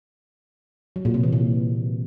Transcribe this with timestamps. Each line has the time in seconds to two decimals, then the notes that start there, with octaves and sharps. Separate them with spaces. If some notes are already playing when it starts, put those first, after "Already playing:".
0.96 F#3
1.05 A#2
1.14 C3
1.23 E3
1.33 A#2